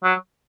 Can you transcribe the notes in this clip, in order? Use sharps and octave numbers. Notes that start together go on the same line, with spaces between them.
F#3